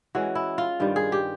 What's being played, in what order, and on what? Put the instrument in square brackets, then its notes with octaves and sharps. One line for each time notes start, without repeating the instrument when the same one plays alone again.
[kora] E3 G#3 C#4 F#4
E4
F4
G2 D#3 G3
G#4
G4